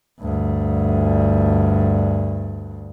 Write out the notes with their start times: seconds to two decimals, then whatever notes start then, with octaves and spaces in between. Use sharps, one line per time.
0.19 D2 G2